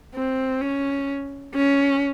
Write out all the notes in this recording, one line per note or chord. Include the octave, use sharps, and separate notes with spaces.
C4
C#4
C#4